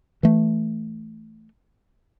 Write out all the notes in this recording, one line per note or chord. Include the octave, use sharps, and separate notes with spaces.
E3 A3